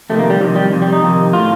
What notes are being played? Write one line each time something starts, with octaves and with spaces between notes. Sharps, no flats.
F2 C3 D#3 A3
A#3
G3
F2 C3 D#3 F3
G3
F2 C3
G3
D#4
F2 C3 D#3
A2 F4